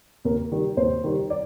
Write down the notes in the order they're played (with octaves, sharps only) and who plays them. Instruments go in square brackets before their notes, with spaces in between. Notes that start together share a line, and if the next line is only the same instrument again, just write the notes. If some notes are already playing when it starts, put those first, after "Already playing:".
[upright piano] D#2 A#4
D#3 G3
D#2 C5
D#3 G3
D5